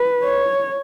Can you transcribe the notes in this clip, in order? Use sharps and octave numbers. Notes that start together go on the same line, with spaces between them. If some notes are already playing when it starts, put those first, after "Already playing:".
Already playing: B4
C#5